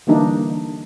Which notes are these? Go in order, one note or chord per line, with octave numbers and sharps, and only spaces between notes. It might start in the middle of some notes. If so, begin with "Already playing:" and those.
D3 E3 G3 A#3 D4 D#4